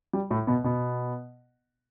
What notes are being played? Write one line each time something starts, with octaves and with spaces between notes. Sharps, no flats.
G3
A2 A3
B2 B3
B2 B3